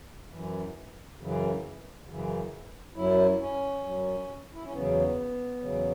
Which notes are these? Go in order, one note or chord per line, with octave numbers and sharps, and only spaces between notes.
F#2 E3
F#2 C#3 E3
F#2 C#3 E3
F#2 F#3 E4
C#4
F#2 F#3
E4
C#4
E2 C#3 F#3 B3
E2 C#3 F#3